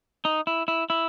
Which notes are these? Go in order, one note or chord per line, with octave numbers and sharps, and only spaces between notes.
D#4
E4
E4
E4